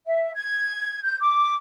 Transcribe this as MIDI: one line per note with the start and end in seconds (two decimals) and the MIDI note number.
0.05 0.30 76
0.35 1.00 92
1.02 1.17 91
1.20 1.52 86